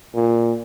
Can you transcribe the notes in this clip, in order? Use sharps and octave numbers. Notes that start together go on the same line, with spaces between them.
A#2